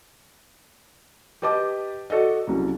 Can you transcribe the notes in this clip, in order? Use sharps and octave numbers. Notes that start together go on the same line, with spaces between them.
G4 B4 D#5 A5 D6
F#4 A4 D5 D#5
C2 C#3 F#3